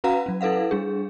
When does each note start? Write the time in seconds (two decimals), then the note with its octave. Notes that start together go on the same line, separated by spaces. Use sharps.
0.04 C#4 F#4 B4 F5 F#5 A#5
0.26 F#3 C#4
0.41 E4 A4 B4 F5 F#5
0.71 G3 D4 G#4